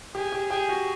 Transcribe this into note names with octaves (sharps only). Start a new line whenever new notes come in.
G4 G#4
G4
G4 G#4
F#4